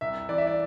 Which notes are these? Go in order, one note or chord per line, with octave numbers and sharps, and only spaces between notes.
C2 E5
E3 D5
E5
D5